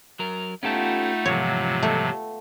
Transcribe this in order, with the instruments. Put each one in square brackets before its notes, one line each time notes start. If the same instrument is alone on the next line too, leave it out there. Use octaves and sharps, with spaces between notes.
[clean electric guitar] F#3 A#4
[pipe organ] A3 D#4 [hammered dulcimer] B3 F4 [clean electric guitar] C#4 G4 A4
[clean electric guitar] E2 G#2 F3 [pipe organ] C3 F#3 [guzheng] C#5 [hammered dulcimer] F5
[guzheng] A3